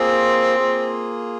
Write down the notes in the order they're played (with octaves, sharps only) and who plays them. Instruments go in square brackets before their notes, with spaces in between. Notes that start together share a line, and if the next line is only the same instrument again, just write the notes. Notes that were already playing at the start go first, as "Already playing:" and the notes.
Already playing: [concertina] A#3 F4 G#4 [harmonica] C4
[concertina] A#3 F4 G#4